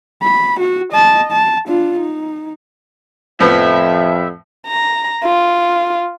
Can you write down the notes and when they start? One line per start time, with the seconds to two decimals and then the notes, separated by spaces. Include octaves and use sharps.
0.23 B5
0.60 F#4
0.93 D#5 A5
1.32 A5
1.68 D4 F4
2.00 D#4
3.40 F2 A2 F3 B3 E5
4.67 A#5
5.24 F4